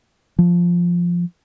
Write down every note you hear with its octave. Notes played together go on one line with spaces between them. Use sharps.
F3